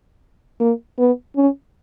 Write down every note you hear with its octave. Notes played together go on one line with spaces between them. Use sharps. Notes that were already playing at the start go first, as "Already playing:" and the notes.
A#3
B3
C#4